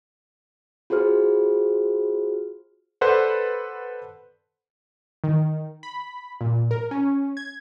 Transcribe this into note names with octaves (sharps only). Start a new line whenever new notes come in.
F4 F#4 G#4 C5 F6
A4 B4 C5 D5 F#5
D#3
B5
A#2
A#4
C#4
G#6